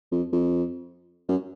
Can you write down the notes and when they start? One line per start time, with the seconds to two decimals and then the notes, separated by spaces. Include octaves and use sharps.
0.12 F2
0.33 F2
1.29 F#2